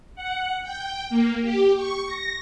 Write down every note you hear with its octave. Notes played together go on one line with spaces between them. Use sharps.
F#5
G5
A#3
G4
C#6
A#6